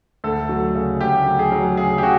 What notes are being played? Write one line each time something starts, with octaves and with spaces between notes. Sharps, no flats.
D2 A4
F#3
C#3
D2 G4
F#3
G#4
F#3
C#3 G#4
G4
C#3 F#4